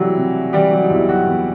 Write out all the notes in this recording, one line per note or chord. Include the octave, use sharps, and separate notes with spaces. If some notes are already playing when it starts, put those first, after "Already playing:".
Already playing: C3 E3 F#3 G3 A3 E4 F#4 G4
C3
E3 G3 G4
F#3 F#4
D#4
E2 E4
F#3 F#4
E2